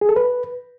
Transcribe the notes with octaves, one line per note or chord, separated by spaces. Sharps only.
G#4
A4
B4